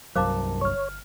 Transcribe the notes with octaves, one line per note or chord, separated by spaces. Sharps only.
C2 G2 F#3 A#4 C5 F5 A5 D6
G1 C#5 F6